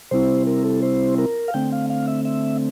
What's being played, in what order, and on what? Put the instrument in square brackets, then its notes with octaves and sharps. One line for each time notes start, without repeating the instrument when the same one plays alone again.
[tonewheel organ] C3 G3 C4 E4 C5
A#4
A4
C5
A#4
F5
D3 A3 C4 G5
F5
F5
E5
E5